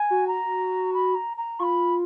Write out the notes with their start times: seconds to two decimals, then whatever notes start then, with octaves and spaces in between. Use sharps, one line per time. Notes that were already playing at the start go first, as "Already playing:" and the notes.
Already playing: G#5
0.10 F#4
0.27 A#5
0.94 B5
1.15 A#5
1.37 A#5
1.59 F4 C#6
1.63 B5